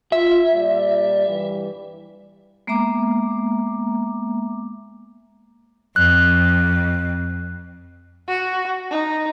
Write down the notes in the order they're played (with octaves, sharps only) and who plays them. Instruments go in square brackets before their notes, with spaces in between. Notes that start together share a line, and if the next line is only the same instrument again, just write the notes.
[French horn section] F4 [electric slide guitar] E5
[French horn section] A#2 G3 D5
G2 E3 G3
[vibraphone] G#3 A#3 B3 E5 A#5 D6
[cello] F2 [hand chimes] F#6
[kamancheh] F#4
D#4